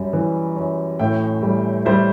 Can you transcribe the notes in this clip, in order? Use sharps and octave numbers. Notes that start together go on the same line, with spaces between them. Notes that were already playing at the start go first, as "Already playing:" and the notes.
Already playing: F#2 G3
E3
F#2
A2 E5 G5
G3
G3 C5 E5